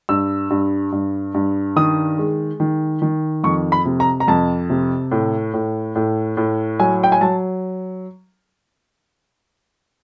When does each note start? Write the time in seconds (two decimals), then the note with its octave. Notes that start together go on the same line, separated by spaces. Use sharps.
0.09 G2 E6
0.50 G2
0.92 G2
1.34 G2
1.76 D#3 D#6
2.18 G#3
2.60 D#3
3.02 D#3
3.44 F2 C#6
3.72 B5
3.85 C3
4.00 A#5
4.20 A#5
4.28 F2 A5
4.70 C3
5.12 A2
5.54 A2
5.96 A2
6.37 A2
6.79 F#3 G#5
7.04 G5
7.12 G#5
7.21 F#3 A5